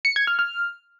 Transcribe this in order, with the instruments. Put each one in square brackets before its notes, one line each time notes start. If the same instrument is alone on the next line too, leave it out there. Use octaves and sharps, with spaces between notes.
[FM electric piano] C#7
G#6
F6
F6